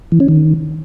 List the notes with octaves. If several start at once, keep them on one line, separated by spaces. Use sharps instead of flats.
E3
C#4
D#3